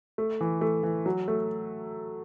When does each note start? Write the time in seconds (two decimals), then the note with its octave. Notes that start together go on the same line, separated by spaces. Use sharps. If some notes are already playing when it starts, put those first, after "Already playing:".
0.18 A3
0.41 E3
0.61 A3
0.83 E3
1.06 F#3
1.28 A3